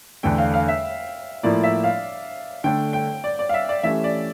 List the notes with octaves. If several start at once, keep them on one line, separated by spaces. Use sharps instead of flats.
E2 D3 A3 D4 G5
F5
F5
E5
A2 F3 A#3 E4 D5
E5
F5
D3 A3 D4 G5
G5
D5
D5
F5
E5
D5
E3 A3 C#4 G4 E5
D5